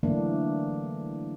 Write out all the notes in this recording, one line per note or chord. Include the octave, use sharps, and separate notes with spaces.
D3 E3 F#3 A3 A#3 D4